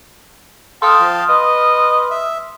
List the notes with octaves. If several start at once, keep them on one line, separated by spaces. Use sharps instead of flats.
A4 F5 G5 A5 C6 D#6 F6
F3
B4 D#5
E5